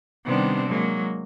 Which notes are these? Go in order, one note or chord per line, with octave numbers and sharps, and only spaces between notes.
C3 D#3 G3 B3 C4 D4
F#3 G#3 A#3